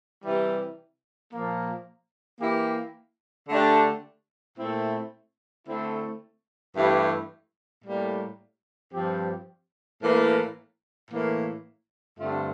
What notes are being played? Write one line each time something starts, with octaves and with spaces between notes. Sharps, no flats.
C3 E3 G3
A#2 F3 A#3
E3 A#3 E4 G4
D3 A3 D4 G4
A#2 A3 C4 E4
D3 A3 C4 E4
G2 E3 A3 E4 G4
A2 G3 A#3
G2 F3 C4 G4
A2 E3 A#3
A2 E3 A#3
G2 D3 A3 C4 F4